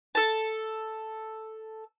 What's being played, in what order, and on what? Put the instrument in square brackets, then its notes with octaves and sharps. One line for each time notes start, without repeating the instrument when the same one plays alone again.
[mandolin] A4 A5